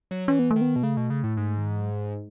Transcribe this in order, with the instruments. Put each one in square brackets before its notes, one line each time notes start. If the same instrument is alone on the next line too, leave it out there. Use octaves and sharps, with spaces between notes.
[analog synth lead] F#3
[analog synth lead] E3 [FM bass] C#4
[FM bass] B3
A3
[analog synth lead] D#3
[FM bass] B3
[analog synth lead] B2
[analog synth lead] C#3 [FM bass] A3
[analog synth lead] B2
C#3
A2
G#2
[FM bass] D#3
E3
F#3
G#3